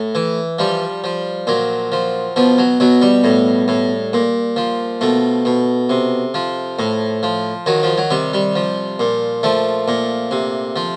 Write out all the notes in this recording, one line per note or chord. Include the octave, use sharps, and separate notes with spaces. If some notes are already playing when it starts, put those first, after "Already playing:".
Already playing: A2
E3
F3 G3
F3
A#2 F#3
F3
B2 F3
F#3
B2 F#3
G3
A2
A2
A#2
F3
B2 A3
B2
C3
F3
A2
F3
D#3 F#3
F3
F#3
C3 G3
G3
F3
A#2
F3 A3
A#2
C3
F3